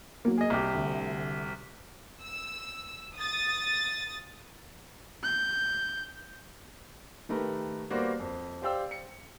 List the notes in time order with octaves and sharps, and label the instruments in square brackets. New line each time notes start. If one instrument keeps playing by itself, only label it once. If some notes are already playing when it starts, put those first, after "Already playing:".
[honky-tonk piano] F#3 A#3
[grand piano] G#4 D#5
C2 G4
[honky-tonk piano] D2
[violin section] E6
D#6 A6
[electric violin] G6
[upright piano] D#3 A3 G4 A#4 B4
G3 A#3 B3 F#4 C5 D5
F2
G4 C5 D5 F5 G5 E6
C#7